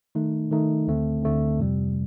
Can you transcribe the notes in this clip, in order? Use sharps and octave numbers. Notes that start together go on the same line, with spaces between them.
D#3 A3 D#4
D#3 A3 D#4
D2 D3 A3 C4
D2 D3 A3 C4
F2 C3 G3